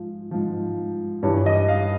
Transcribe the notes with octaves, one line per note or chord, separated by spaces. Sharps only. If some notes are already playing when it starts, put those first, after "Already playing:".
Already playing: G#2 F3
G#2 F3
G2 E3 C#5
D#5
F5